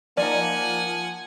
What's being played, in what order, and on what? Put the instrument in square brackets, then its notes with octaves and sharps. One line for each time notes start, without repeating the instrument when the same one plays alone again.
[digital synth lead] F3 [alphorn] A#3 [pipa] D#4 F4 D5 [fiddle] F#5 G#5